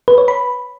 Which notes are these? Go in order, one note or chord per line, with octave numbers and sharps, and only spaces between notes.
B4
C#5
B5